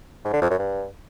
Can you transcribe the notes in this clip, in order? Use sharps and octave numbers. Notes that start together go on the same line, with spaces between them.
G#2
D3
F2
F#2
G2